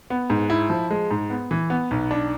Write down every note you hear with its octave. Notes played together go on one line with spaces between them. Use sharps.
B3
G#2
E4
F3
G#3
G#2
B3
E3
B3
B1
D4